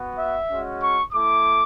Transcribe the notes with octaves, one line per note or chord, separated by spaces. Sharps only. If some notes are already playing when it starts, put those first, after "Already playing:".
Already playing: B3 F#4
E5
G#3 C#4 F#4
C#6
A3 E4 D6